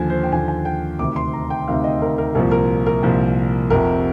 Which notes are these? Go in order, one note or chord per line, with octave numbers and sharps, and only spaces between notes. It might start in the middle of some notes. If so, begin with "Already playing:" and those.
Already playing: D#2 D3 F3 G#5
C5
G5
D#2 D3 F3 G#5
G#5
G5
D2 C3 D#3 D6
C6
A#5
G5
D2 C3 D#3 F5
D#5
A#4
A#4
C2 A#2 F3 A#4
A#4
A#4
C2 A#2 F3
F1 F2 C3 A#4